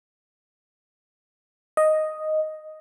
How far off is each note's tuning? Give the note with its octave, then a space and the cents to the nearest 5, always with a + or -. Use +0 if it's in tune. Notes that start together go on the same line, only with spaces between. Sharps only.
D#5 +0